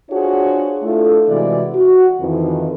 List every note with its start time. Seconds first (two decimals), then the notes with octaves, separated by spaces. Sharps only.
0.10 D4 F4 F#4 G#4 C5 C#5
0.83 A3 D4 E4 F4 A4
1.29 C3 E3 G#3 E4 F#4 D5
1.74 F#4
2.19 F2 D#3 E3